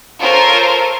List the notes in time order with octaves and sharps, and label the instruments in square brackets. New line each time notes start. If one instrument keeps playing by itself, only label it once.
[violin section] F4 A4 A#4 C5 C#5